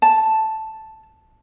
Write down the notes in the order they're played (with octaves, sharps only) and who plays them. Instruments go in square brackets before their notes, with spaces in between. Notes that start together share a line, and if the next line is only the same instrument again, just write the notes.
[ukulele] A5